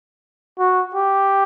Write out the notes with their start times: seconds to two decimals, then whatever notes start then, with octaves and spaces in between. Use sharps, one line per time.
0.59 F#4
0.95 G4